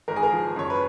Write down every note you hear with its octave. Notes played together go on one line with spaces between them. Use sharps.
G#1 A#4
G#4
A#4
F3
F#2 C#5
B4